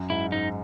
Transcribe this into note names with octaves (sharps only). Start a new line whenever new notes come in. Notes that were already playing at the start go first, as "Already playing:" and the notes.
Already playing: F#2
G#2 E4
G#2 D#4